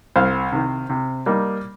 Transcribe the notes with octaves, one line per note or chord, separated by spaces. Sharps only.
C2 C5 F5
C3 D#3
C3
G3 A#3 D#4